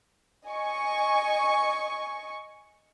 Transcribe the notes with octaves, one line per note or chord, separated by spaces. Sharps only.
D#5 G#5 C#6